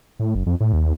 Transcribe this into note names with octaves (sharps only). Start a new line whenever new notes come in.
A2
F#1
F2
A2
D#2